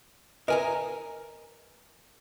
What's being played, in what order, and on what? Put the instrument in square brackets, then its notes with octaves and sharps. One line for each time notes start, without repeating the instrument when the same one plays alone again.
[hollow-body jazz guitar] A#4 G#5 A#5 [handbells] B4 D#5 E5